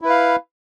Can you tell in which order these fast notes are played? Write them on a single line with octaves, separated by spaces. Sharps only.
E4 B4 F5